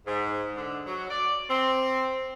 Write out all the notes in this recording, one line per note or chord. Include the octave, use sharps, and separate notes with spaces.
G#2
D3
F#3
D5
C4